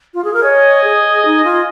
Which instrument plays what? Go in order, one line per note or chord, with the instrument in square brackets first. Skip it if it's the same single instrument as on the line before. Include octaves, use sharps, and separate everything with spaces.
[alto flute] F4
G#4
A#4
[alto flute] C#5 [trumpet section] D#5 G#5
[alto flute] G#4
D#4
F4